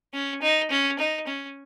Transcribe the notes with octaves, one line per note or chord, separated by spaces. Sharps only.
C#4
D#4
C#4
D#4
C#4